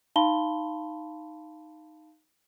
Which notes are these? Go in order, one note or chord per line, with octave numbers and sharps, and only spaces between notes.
D#4 F5 A5 B5 C6 G7